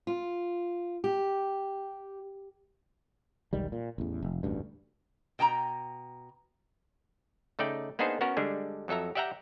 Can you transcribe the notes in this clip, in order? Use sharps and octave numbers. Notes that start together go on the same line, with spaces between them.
F4
G4
E1 B1 D#3 G3
A#2
A1 E2
F1
E1 A1 D2 G2
B2 G5 A5 A#5
C#3 A3 D#4 D5 G5
A#3 B3 D4 D#4 G#4 C5
B3 C#4 F#4 A#4 C#5
D3 G3 G#3 D4
F2 F#3 A4 E5 A#5
G4 D5 E5 F#5 G5 A#5